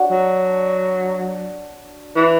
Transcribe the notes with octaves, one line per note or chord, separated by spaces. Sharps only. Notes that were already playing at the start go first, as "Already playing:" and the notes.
Already playing: D4 F#4 C#5
F#3
E3